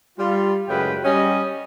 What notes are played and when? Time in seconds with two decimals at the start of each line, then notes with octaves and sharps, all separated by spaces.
0.18 G3 F4
0.69 F#2 A2 C#3 G#3 B4 G5
1.04 G3 C#4 D#5